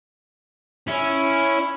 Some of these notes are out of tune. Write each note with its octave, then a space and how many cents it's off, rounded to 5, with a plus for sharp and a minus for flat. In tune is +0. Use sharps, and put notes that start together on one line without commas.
C#4 +0 E4 +0